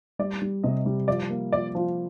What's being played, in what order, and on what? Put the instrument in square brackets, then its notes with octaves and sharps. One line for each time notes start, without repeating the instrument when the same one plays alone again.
[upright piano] G3 [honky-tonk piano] D5
[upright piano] G3
[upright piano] C3 [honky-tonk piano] D#5
[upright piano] G3
[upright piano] F3 [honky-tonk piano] D5
[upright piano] A#3
[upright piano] F3 [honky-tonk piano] D5
[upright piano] F3